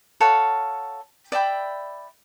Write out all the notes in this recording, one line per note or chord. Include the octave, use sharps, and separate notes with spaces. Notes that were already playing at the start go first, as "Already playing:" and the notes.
A4 C#5 F5 F#5
D5 E5 G5 B5